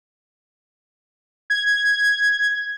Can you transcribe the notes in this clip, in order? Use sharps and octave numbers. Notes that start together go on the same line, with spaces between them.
G#6